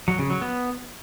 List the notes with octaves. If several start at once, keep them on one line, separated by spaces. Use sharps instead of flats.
F#3
C#3
F#3
B3